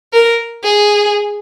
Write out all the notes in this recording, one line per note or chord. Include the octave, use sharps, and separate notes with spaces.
A#4
G#4